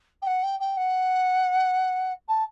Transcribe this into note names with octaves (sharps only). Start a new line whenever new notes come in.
G5
F#5
G5
G5
F#5
A5